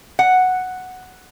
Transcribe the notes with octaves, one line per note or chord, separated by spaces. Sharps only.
F#5